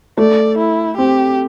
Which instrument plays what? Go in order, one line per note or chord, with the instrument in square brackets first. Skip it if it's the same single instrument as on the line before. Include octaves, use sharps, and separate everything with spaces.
[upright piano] A3 [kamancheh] D5
[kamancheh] E4
[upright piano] C4 [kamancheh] G4